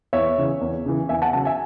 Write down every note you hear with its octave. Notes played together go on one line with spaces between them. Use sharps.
E2 C#5 E5
C#3 E3
E2
C#3 E3
E2 E5 G#5
F#5 A5
C#3 F#3 F#5 A5
E5 G#5